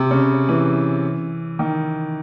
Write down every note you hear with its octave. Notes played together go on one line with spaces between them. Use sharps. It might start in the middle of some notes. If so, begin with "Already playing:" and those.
Already playing: C3
C#3
E3
D#3